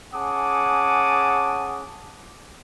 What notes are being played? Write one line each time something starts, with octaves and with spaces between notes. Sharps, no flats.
C#4 G#4 F#5 A5 D6 D#6